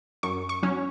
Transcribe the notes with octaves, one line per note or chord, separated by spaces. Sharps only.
F#2 C#6
C#6
F#3 C#4